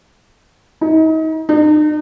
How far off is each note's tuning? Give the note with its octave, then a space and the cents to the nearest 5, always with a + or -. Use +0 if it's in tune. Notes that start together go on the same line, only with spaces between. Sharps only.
D#4 +35
D#4 -40